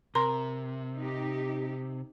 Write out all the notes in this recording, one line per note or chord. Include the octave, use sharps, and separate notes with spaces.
C3 A#4 C6
D#4 G4